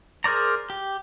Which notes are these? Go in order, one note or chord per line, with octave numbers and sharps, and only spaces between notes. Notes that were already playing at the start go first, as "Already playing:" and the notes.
G#4 A#4 C5 D5 A#5
G4